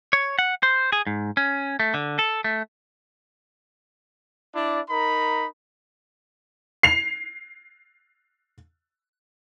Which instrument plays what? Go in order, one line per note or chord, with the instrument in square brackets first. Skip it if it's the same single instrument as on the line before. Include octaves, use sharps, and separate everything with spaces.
[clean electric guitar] C#5
F#5
C5
G#4
G#2
C#4
A3
D3
A4
A3
[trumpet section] D4 E4 D5
D#4 A#4 B5
[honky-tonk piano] C7 F7